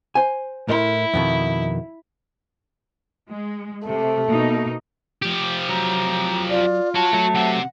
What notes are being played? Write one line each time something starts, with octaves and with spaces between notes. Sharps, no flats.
C5 G#5
A2 E4 A#4 C6
F2 B2 D#3
G#3
C3 A3
B2 A#3 D#4
F3 G4
F#3 A#5
F4 D5
F#4 C#5 A5
F#3 A3
C3 C4 F#5